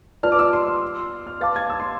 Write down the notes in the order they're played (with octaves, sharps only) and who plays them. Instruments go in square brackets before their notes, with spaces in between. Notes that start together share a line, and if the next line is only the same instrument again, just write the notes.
[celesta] F4 B4 D5 A5 [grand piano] F6
[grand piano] D6
E6
C6
F6
[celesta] B4 F5 A5 D6 [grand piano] A6
[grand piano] G#6
E6
C6